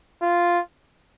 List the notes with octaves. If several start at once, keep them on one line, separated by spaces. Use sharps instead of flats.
F4